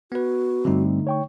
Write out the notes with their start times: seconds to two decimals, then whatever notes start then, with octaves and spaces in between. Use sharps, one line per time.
0.12 B3 F#4 B4
0.65 G2 D3 G3 A3 C4 D#4
1.07 C#5 G5 C#6